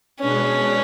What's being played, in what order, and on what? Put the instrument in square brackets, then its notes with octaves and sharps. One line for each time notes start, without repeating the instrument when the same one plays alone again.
[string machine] B2 G#3 D4 G#4 B4 [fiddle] C#4